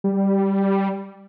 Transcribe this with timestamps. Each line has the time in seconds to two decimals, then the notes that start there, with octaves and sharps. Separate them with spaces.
0.04 G3